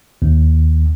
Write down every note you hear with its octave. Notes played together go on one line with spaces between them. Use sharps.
D#2